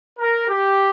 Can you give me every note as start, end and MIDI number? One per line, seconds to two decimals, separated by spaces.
0.19 0.46 70
0.48 0.90 67